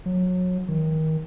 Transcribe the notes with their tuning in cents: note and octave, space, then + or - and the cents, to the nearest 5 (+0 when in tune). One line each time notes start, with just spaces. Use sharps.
F#3 -25
D#3 +25